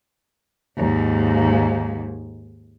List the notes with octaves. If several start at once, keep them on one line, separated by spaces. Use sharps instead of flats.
D#2 G#2